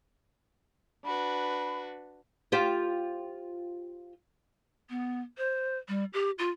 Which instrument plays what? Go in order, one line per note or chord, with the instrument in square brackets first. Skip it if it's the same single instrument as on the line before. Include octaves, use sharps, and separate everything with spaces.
[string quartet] D4 F#4 B4 [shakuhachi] B5
[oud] F4 G4 C5
[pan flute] B3
C5
G3
G4
F4